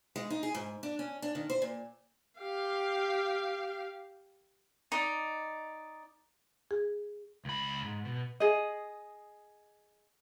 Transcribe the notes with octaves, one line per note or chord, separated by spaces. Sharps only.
G#3
D#4
G#4
G#2
D4
C#4
D4
D#3
C5
A#2
G4 F5
D#4 D5
G#4
C#2 B5
G#2
B2
G#4 D#5